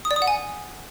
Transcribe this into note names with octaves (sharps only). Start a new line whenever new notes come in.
D#6
D5
D#6
F#5
G#5